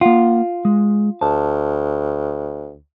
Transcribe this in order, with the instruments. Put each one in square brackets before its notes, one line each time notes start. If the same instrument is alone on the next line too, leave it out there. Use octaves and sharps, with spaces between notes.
[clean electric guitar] A#3 F#5 [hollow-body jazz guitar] F4
[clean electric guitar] G#3
[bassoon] D2 [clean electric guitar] A5